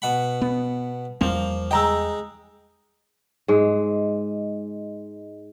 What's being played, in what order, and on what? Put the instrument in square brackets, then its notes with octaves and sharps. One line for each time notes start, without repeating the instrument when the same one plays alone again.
[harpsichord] B2 F#5 B5
[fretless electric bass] B3
[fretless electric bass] E2 G3 C4 [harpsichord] F3 A#3
[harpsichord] G#3 D#4 [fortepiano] G5 A#5 E6
[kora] G#2 G#3